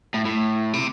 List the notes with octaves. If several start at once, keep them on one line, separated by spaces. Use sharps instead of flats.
A2
A2
C3